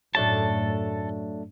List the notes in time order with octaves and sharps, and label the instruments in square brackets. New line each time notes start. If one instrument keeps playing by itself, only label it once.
[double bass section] F#2 A2 [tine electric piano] F#3 A3 D4 [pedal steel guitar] A4 A5